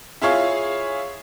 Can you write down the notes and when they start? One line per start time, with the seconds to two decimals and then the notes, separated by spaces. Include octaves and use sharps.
0.22 E4 F4 G#4 C#5 F5